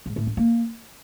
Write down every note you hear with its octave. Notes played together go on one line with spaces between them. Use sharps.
G#2
A2
G2
A#3